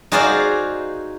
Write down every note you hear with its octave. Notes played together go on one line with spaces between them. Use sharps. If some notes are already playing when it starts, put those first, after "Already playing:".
D#4 F#4 G#4 C5 D5 F5